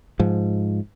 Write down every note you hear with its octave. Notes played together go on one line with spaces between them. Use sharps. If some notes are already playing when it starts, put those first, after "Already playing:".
G#2 F3